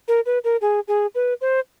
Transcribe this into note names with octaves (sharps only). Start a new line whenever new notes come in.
A#4
B4
A#4
G#4
G#4
B4
C5